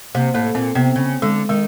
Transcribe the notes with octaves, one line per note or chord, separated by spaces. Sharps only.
C3 A#3
A2 A#3
A#2 C4
C3 B3
C#3
D3 G#3
D#3 G#3